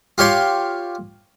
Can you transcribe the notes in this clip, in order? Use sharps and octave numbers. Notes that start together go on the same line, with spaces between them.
F4 G4 C#5 C6